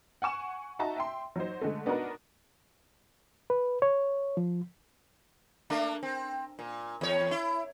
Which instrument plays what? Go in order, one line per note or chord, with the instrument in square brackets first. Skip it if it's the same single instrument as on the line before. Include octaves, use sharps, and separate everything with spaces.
[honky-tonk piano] F#5 G#5 C#6 E7
D#4 F#4 E5 A5 A#5
E5 G5 C6
F#3 D#4 C5
D3 G#3 A3
B3 D4 D#4 F#4 A#4 B4
[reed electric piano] B4
C#5
F3
[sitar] A3 A#3 D4
C4
A#2
E2 C#5
E4